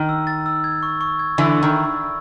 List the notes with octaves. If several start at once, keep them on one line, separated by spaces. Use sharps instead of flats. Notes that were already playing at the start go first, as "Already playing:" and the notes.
Already playing: D#3
E6
A6
E6
G#6
C#6
C#6
G#6
D3 E3 B5
E6
D#3